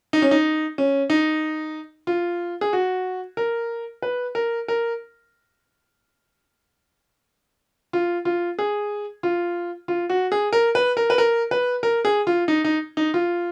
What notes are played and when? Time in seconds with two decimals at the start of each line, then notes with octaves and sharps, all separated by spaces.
0.13 D#4
0.22 C#4
0.31 D#4
0.78 C#4
1.10 D#4
2.07 F4
2.61 G#4
2.73 F#4
3.37 A#4
4.02 B4
4.35 A#4
4.68 A#4
7.93 F4
8.25 F4
8.59 G#4
9.23 F4
9.88 F4
10.10 F#4
10.32 G#4
10.53 A#4
10.75 B4
10.97 A#4
11.10 B4
11.18 A#4
11.51 B4
11.83 A#4
12.05 G#4
12.27 F4
12.48 D#4
12.64 D#4
12.97 D#4
13.14 F4